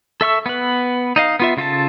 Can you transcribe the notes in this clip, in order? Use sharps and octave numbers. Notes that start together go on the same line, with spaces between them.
A4 E5 C#6 E6
B3 B4
D#4 D#5 F5
B3 F4 E5
C#3 F4 A4 A5